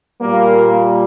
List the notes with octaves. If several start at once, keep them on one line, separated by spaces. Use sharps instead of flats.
A#2 G3 A#3